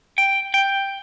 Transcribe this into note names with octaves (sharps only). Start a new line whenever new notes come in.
G5
G5